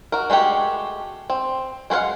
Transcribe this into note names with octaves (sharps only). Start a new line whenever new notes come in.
F#4 A#4
G#3 A3 F#4 G4
C4
G#3 F#4 B4 F5 F#5